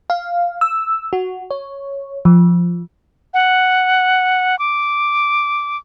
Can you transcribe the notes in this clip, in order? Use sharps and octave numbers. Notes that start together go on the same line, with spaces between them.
F5
E6
F#4
C#5
F3
F#5
D6